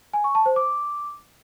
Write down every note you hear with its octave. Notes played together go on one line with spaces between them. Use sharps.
G#5
C#6
A5
C5
D6